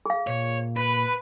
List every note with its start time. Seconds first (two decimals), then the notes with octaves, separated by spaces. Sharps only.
0.06 G#4 F5
0.27 A#2 C#5
0.77 B4 B5